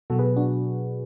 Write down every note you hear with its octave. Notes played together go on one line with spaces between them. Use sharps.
B2 F#3 F#4 A4
G#4 B4
D4 F#4